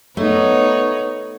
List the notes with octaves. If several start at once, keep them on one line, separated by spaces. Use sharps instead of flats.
A3 B3 D#4 C#5